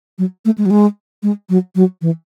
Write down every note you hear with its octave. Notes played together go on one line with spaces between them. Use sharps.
F#3
A3
G#3
F#3
G#3
G#3
F#3
F#3
E3